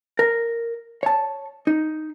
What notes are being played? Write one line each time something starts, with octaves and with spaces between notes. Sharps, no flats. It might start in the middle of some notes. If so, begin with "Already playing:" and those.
A#4
C#5 A5
D#4